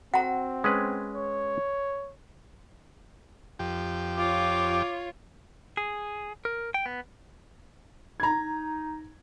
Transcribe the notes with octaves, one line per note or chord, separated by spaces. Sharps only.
C4 F#4 F#5 A#5
G#3 C#4 B4
C#5
F2 G4
F4 C#5 D6
G#4
A#4
G5
B3
D#4 A#5 G#6